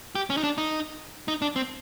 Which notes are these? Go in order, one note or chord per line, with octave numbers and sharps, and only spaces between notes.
G4
C#4
D#4
D4
D#4
D#4
D4
C4